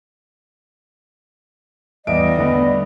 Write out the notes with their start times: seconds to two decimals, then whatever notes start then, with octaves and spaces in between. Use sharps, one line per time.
2.07 E2 G3 D#5 E5 D7
2.37 D3 B3